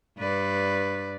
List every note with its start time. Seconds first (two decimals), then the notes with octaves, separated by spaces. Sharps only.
0.18 G2 B4 D5